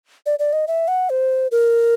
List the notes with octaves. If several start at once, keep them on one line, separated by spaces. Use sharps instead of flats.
D5
D5
D#5
E5
F#5
C5
A#4